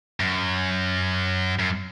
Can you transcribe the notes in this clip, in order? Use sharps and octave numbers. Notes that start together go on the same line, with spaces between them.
F#2
F#2